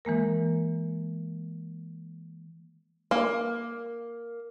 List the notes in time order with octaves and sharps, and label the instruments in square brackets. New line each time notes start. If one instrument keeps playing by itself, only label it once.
[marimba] E3 G#3 A#3 A#4
[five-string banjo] A#3